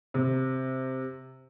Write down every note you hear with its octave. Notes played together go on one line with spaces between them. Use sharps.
C3